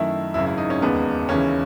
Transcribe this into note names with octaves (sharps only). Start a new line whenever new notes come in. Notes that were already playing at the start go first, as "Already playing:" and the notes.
Already playing: F#2 D#3 A3 E4
G#1 F#2 C#3 E4
E4
D#4
C#4
E1 D#2 C#3 G#3 B3
D#2 C#3 E3 G#3 C#4